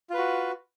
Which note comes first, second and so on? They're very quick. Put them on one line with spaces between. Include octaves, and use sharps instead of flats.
F4 B4 F#4